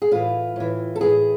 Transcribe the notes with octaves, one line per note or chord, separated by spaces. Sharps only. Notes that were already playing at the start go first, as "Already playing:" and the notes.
G#4
A2 E3 F4
A2 E3
A4
A2 E3 G#4